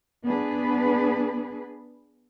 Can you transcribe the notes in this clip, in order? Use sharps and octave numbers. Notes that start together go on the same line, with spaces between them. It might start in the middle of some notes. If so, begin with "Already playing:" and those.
B3 D4 G#4 B4